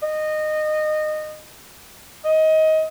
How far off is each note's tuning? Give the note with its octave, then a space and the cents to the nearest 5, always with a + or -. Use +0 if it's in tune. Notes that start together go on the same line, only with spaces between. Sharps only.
D#5 -20
D#5 +20